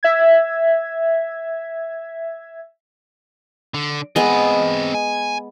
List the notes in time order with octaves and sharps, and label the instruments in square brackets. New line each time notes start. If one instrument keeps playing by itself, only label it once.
[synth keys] E5 G#6
[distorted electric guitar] D3
[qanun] G#3 B3 [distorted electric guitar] C4 D#5
[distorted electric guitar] G#5